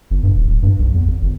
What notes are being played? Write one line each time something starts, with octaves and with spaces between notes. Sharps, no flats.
G1
G2
D1
D1
G2
B1
E2
G#1
G1